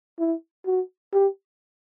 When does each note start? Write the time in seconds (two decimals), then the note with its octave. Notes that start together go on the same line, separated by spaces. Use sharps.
0.19 E4
0.66 F#4
1.13 G4